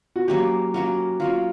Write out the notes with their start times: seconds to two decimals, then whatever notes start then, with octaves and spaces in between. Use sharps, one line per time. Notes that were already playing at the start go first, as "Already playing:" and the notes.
0.16 F#4
0.28 F#3 A#3 C#4 G4
0.74 F#3 A#3 C#4 F#4
1.20 F#3 A#3 C#4 F4